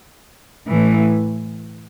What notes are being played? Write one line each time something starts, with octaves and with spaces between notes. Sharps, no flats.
A2 E3 A3